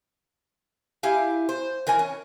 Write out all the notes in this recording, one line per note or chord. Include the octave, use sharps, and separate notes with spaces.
E4 G4 F5 G#5
C5
E3 A#4 D#5 G#5
C#4